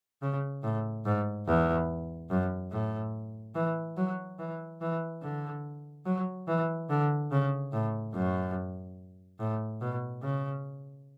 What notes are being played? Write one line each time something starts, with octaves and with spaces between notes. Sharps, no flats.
C#3
A2
G#2
E2
F#2
A2
E3
F#3
E3
E3
D3
F#3
E3
D3
C#3
A2
F#2
A2
B2
C#3